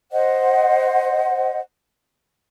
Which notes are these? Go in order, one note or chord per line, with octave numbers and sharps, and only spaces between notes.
C5 D#5 F#5